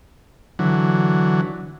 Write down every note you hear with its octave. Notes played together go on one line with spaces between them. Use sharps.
D3 E3 F#3